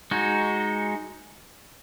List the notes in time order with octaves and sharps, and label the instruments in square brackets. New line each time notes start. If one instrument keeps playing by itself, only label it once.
[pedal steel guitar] G#3 D#4 F#4